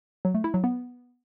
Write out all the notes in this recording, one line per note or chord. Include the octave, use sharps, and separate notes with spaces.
F#3
A3
E4
F#3
B3